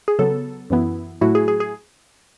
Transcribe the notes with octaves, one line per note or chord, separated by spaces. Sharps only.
G#4
C#3 F#3 B3 A4
F#2 E3 B3 E4
A2 F#3 A3 E4 F#4
G#4
G#4
G#4